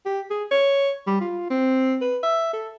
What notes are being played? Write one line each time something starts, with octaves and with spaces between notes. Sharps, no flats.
G4
G#4
C#5
G3
F4
C4
B4
E5
A4